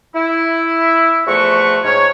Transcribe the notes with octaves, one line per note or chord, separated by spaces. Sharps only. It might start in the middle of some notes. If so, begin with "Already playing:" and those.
E4
E2 F3 A3 F#4 C#6
G#2 C#5